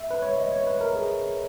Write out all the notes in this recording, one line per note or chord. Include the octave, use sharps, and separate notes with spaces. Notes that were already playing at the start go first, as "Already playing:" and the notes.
Already playing: E5
B4
C#5
D#5
C#5
B4
A#4
G#4